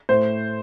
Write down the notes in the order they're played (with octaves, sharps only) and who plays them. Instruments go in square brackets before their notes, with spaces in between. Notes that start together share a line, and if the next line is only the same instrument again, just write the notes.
[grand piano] A2 C5